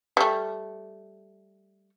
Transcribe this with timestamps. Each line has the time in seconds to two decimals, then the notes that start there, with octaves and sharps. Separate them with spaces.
0.17 G3 A3